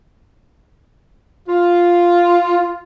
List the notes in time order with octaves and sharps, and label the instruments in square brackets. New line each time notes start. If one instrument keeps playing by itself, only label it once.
[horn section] F4